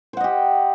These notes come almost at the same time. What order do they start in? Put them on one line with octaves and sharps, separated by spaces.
C5 F#5 D#5 G4